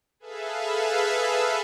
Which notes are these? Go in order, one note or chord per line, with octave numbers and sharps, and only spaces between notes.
G#4 A4 B4 E5 F5